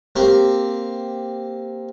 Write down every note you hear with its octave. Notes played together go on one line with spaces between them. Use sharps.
A#3 C4 G4